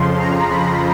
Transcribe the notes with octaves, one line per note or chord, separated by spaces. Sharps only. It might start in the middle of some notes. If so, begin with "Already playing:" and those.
Already playing: F2 C#3 F3 C6
A#5
B5